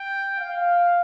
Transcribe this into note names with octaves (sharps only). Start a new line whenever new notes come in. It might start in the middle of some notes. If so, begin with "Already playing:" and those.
Already playing: G5
F5